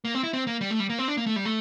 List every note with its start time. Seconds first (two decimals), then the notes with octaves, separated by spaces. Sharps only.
0.05 A#3
0.14 C4
0.23 E4
0.33 C4
0.47 A#3
0.61 G3
0.71 A3
0.80 G3
0.90 A#3
0.99 C4
1.08 D4
1.17 A#3
1.27 A3
1.36 G3
1.45 A3